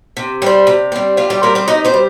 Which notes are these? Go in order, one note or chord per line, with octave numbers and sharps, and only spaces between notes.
C3
G3 C4
C3
G3 C4
C3 F4
G3 G4
G3 A#3 C4 A#4
C4 C5
C3 D#4 D#5
C4 C5
G3